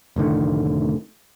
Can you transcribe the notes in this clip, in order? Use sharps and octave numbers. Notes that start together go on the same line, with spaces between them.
F1 A2 D3 D#3